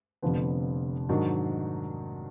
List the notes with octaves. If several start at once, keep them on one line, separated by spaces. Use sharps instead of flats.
F1 F2 D3 F3 B3
G#2 D#3 F#3 D4